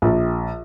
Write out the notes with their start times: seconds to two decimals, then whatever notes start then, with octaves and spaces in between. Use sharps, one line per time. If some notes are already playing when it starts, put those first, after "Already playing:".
0.02 A#1